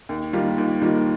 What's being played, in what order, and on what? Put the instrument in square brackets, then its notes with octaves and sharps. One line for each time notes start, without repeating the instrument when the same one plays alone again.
[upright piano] D#2
D#3 G3 A#3 F4
D#2
D#3 G3 A#3 F4